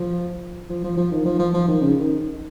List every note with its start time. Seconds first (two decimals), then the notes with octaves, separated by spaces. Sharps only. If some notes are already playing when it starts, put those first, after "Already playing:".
Already playing: F3
0.69 F3
0.84 F3
0.97 F3
1.12 D#3
1.25 F3
1.39 F3
1.54 F3
1.68 D#3
1.81 C#3
2.00 D#3